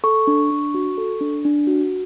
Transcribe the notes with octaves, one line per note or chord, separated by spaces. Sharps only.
A4 C#6
D4
D4
F#4
A4
D4
D4
F#4